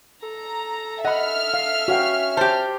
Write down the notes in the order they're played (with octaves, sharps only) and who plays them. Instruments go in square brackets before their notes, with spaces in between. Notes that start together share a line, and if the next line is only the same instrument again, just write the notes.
[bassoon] A4 [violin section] A#5
[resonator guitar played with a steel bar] D#5 [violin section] E5 F6 [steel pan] F#5 B5
[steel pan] F5
[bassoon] C#4 [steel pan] F#4 F5 G5
[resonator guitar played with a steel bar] G4 C5 [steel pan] A5